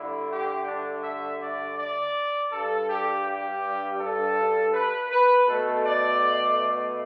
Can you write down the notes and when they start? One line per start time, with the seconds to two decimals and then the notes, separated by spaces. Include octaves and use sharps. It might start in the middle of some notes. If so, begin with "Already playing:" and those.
Already playing: G2 D3 A3 E4
0.30 G4
0.67 D4
1.04 E5
1.41 D5
1.78 D5
2.52 G2 G3 A4
2.89 G4
3.25 G4
4.00 A4
4.73 B4
5.10 B4
5.47 B2 A3 A4
5.84 D5